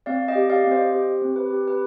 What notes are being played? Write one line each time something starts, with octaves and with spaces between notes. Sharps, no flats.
C4 D5 F5
D#5 G5
G4
D5 F5
C4
C5 D#5
G4 C5
C4
B4
G4
B4